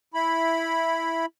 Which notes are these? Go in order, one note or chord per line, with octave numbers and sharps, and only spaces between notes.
E4 B5